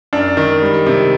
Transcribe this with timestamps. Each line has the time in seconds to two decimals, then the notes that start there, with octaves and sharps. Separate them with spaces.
0.13 F#2 D4
0.37 D#3
0.62 G3
0.87 C3